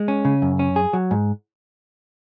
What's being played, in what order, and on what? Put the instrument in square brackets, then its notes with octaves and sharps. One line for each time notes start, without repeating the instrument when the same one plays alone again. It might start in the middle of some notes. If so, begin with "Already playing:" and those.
Already playing: [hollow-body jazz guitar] G#3
C#4
C#3
F#2
C#4
G#4
F#3
G#2